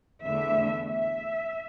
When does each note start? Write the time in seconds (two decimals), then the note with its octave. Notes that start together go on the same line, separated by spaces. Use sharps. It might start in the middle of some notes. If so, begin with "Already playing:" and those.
0.25 E2 D3 A3 D4 E5
0.89 E5